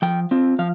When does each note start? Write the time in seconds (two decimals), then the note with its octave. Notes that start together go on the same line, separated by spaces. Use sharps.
0.02 F3 G5
0.31 C4 F4
0.59 F3 F5